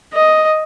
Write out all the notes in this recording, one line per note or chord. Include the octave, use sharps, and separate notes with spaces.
D#5